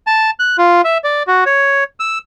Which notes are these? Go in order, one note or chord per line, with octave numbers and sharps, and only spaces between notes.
A5
F#6
F4
E5
D5
F#4
C#5
E6